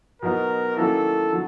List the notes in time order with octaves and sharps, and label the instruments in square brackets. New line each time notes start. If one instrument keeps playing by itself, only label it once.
[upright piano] B2 F#3 B3 D#4 [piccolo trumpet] A#4
[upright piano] D#3 F#3 A#3 C#4 E4 [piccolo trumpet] A4
[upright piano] D3 F#3